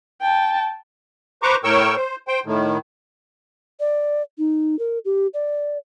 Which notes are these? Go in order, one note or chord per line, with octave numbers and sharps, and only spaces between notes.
G5 A5
B4 C5 A#5 C#6 D6
A2 A#4 C#5 G5 C#6 E6
C5
C5 G5
A2 D#3
D5
D#4
A#4
G4
D5